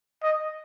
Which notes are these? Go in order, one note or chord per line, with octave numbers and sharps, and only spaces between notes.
D#5